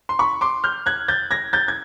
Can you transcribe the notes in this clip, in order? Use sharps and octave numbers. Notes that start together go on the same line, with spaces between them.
C6
B5 C#6
C6 D6
F6 G6
F#6 G#6
G6 A6
G#6 A#6
G6 A6
G#6